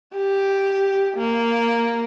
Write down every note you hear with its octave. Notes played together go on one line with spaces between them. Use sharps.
G4
A#3